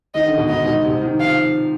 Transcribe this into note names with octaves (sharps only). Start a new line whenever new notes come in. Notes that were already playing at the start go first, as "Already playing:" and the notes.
D#3 D#5
D3
B2
G#2 D#5
B2
C3
D#3
F3 F5